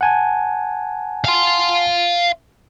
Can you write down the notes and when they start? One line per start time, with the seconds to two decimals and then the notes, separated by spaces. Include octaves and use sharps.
0.01 F#5 G#5 A5
1.25 F5 C6